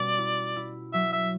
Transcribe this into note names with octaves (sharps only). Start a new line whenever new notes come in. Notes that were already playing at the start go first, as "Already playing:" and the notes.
Already playing: B2 G3 C#4 D5
E4
E4
F#3 E5
E5